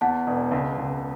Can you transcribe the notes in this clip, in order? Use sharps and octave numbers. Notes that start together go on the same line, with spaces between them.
E2 F#5 A5
E1
C#2
C#2